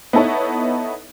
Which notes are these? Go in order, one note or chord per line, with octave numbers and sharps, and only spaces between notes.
B3 D#4 E4 A4 C#5